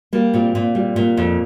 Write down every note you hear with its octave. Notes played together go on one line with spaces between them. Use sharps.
G3 A#3
A#2 C4
A#2
G3
A#2
F2